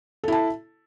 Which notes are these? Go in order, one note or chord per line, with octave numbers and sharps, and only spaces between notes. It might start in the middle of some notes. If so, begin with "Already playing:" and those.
E4 A4 A5